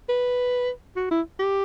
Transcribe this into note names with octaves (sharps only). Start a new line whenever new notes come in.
B4
F#4
E4
G4